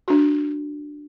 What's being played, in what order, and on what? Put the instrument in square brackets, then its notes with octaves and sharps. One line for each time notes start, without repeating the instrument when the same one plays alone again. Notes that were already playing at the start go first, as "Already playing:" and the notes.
[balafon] D4 F#4